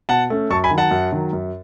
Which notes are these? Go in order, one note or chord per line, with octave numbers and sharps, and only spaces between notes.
B2 F#5 A5
A3 C#4
F#2 A5 C#6
G#5 B5
D#3 F#3
F#5 A5
F#2
D#3 F#3
F#2